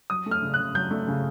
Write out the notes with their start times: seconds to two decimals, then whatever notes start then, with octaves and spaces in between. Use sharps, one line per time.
0.10 F#3 D#6
0.26 A3
0.31 F6
0.42 C#3
0.54 C#3 F#6
0.75 F#3 G6
0.91 A3
1.07 C#3